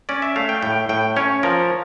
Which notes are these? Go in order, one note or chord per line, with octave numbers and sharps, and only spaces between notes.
C#4 D5
E5
A3 F5
G5
A2 G5
A2 G5
C#4 C#5
F3 A#4